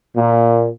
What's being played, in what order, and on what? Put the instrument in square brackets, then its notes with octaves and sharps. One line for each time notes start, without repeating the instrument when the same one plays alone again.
[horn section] A#2